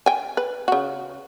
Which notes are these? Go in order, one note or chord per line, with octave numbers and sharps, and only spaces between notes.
G5 G#5
B4
C#3 F#4